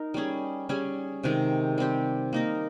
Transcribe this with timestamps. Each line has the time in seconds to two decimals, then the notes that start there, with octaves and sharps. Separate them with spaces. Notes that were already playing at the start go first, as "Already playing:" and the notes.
Already playing: D#4 A#4
0.14 G3 C#4 G#4
0.69 G3 C#4 G#4
1.24 C3 D#3 G#3
1.78 G3 C4 G4
2.33 A#3 D#4 A#4